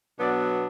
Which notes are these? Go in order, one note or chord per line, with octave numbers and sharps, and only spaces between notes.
B2 F#3 B3 D4 D5